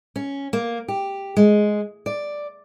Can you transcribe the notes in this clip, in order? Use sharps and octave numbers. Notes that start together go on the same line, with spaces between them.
C#4
A#3
G4
G#3
D5